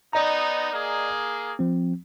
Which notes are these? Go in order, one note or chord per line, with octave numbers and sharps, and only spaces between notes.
B3 D#4 D5 D#5 A#5
A#3 G#4
F3 C4